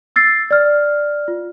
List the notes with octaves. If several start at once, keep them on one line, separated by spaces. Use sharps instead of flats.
E6 A6 C7
D5 F6
F4